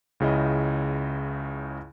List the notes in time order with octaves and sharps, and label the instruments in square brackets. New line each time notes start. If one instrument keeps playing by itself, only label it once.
[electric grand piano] C#2 C#3 E4 D#5